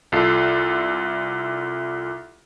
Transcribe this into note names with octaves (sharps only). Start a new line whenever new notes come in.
C2 F4 A4 C7